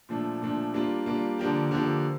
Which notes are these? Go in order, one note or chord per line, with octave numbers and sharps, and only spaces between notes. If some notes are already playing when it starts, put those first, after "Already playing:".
A#2 F3 A3 D4
A#2 F3 A3 D4
G3 A#3 D4 F4
G3 A#3 D4 F4
D3 F3 A#3 D4 G4
D3 F3 A#3 D4 G4